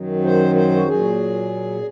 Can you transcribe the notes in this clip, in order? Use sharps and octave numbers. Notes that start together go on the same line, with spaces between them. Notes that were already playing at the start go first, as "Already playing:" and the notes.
Already playing: F#2 D#3 F#3
C5
C5
F#4
A#2 F#3 G#4